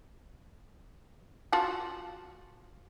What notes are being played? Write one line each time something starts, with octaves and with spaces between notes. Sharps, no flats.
F4 F#4 A5